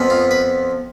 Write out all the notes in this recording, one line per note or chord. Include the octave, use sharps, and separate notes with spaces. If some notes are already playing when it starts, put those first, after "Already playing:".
Already playing: F2 F3 B3
F4
B4